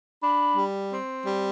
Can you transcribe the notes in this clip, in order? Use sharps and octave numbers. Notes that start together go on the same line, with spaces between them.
D4 B5
G3
C4
G3